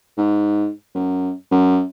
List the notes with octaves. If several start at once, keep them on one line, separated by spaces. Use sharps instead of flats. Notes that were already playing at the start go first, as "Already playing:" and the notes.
G#2
F#2
F#2